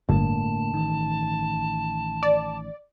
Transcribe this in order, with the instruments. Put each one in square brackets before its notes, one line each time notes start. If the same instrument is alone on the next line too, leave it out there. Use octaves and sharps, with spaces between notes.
[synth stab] G1 [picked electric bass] A2 D3 A#3 [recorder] A5
[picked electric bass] A1 D#3
[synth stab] D5